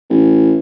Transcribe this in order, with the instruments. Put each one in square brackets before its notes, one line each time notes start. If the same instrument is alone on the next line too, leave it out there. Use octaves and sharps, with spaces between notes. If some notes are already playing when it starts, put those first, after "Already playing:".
[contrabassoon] A1